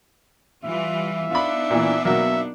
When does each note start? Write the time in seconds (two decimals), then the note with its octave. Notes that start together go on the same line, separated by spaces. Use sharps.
0.65 E3 G3 F4 E5
1.31 B3 D4 D#4 F4 B5
1.70 A#2 E3
2.05 B2 F#3 A#3 E5